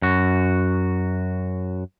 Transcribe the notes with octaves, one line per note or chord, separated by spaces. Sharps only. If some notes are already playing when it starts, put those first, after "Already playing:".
F#2 F#4